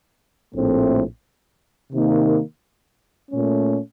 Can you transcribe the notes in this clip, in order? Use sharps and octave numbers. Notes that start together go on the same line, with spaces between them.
A#1 A2 A3 C4
C3 D#3 A#3 D#4
A#2 A3 C#4